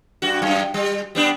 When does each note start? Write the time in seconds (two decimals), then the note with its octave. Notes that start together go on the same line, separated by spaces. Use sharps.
0.22 G2 F#4
0.42 F#2
0.74 G3
1.15 G3 B3 D4